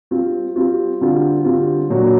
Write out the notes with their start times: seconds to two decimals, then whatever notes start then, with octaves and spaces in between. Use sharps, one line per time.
0.11 G3 C4 F4
0.56 G3 C4 F4
1.01 D3 G3 C4 F4
1.45 D3 G3 C4 F4
1.90 A#2 F#3 A#3 D4 F#4